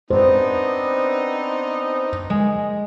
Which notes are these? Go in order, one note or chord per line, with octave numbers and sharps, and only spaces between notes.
B3 C4 D4 D#4 C5
G#3